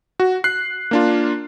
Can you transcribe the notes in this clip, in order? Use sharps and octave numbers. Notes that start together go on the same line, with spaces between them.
F#4
F#6 C7
A#3 D4 F4